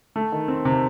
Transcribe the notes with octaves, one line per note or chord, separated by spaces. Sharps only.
A3
D#3
C4
C3